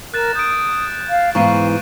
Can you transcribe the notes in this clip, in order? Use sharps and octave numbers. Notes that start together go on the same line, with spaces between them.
A#4 F#6 A6 E7
D#6 G6 D7
F5
G#2 E3 B3 F5 C#6 D#7